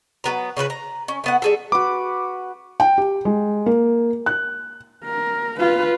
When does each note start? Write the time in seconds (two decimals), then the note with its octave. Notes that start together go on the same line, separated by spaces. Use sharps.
0.24 F#3 B3 A#5
0.57 C#3 C#4 A4 B4
0.70 A#5
1.08 C#4
1.24 A3 B3 F#5
1.42 G3 G#4 A4
1.72 F#4 B4 D6
2.80 G5
2.98 G4
3.25 G#3
3.66 A#3
4.26 F#6
5.04 A#4
5.59 F4 B4